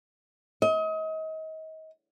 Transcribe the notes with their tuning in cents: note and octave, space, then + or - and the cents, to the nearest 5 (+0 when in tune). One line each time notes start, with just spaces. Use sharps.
D#5 +35